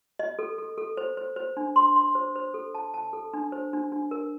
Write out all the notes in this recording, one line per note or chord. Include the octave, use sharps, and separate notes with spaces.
D#5
A4
A4
A4
C5
C5
C5
D4
C6
C6
C5
C5
A4
A5
A5
A4
D4
C5
D4
D4
A#4